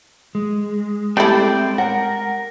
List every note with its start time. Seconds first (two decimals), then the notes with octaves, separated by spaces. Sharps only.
0.35 G#3
1.17 G3 A3 C4 E4 D5 G5
1.78 A#4 F#5